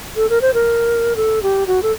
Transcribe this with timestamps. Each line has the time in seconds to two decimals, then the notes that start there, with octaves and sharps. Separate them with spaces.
0.16 A4
0.30 A#4
0.42 C5
0.54 A#4
1.16 A4
1.43 G4
1.67 F#4
1.83 A4